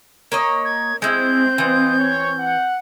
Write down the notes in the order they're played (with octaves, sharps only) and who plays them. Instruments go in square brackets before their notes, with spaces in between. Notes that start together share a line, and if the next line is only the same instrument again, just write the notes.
[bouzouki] A#3 C#5 D#5
[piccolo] G#6
[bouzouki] G#3 E4 [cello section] C4 [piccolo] G6
[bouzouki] E3 [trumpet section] F4 C5 D#5
[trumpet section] C#5
F#5